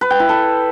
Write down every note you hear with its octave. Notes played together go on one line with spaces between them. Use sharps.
B4
G5
E4
A4